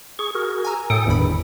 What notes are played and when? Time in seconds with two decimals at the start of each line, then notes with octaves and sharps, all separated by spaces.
0.19 G#4 C#6
0.35 F#4 G#4 A#4
0.65 G#5 A#5 E6
0.90 A2 A4 G5 D#6 C#7
1.06 G1 E2 G2 D3 D#3 B5